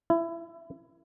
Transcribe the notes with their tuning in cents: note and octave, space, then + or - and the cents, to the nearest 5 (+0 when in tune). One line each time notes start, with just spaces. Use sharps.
E4 +20